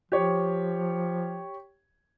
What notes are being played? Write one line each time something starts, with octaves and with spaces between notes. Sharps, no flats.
F3 G4 C#5